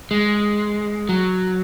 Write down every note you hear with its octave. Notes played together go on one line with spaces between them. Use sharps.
G#3
F#3